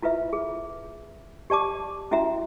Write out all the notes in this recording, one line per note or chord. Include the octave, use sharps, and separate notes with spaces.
E4 F4 B4 E5
G#4
G4 D5 A5 D6
C#4 E4 F#4 E5 A#5